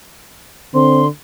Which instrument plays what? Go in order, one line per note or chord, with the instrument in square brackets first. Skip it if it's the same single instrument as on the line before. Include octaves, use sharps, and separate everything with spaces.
[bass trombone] D3 [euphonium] C4 [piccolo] C6